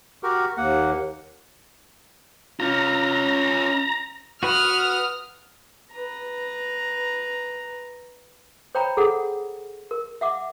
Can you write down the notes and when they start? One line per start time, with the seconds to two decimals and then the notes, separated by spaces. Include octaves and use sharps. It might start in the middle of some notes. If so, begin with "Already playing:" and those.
0.23 F#4 G4 A#4
0.57 D#2 A#3 F#5
2.60 C#4 F4 A#5
4.43 F#4 B4 F#5 D#6 F6
5.94 B4 A#5
8.75 C5 C#5 G5 A#5 B5
8.97 G#4 A4 F#5
9.91 A#4
10.21 E5 F#5 D6